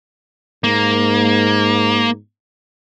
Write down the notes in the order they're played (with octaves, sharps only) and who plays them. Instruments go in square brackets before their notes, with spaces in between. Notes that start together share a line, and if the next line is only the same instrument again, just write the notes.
[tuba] G#2 [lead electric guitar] A#3